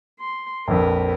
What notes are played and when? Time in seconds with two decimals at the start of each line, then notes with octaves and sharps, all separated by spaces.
0.20 C6
0.68 A#1 F2 A#4 B4